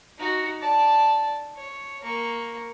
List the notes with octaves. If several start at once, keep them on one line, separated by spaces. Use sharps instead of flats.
D#4 F#4
D5 A5
C#5
A#3 C#6